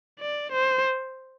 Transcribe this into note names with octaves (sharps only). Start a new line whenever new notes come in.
D5
C5